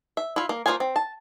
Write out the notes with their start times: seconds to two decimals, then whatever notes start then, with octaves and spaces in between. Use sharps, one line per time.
0.17 E5
0.36 E4 F4
0.49 A#3
0.66 A#3 E4 F4 C5 G#5
0.80 C4
0.96 A5